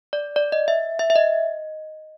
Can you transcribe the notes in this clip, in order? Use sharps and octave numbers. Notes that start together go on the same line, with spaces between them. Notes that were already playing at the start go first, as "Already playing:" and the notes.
D5
D5
D#5
E5
E5
E5
D#5